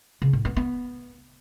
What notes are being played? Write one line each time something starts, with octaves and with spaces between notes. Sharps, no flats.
C#3
A2
B3
B3